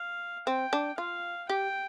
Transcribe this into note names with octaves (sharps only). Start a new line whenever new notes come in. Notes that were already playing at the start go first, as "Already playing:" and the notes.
Already playing: F5
C4 G5
D4
F4 F5
G4 G5